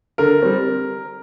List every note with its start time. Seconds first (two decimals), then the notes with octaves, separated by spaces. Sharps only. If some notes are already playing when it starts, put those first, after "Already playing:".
0.18 D3 A#4
0.42 G3 C4